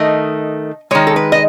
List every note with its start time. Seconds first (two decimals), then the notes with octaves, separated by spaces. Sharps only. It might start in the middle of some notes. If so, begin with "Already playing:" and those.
Already playing: D#3 A3 D#5
0.91 D#3 G#3 C#5
1.07 A4
1.16 B4
1.32 D#5